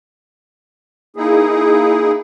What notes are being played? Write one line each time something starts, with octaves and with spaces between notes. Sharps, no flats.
A#3 D#4 E4 G#4